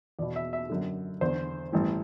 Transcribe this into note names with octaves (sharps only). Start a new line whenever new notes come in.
E2 B2 D5
E5
E5
F#2 D3
E2 D3 C5
A1 G2 E3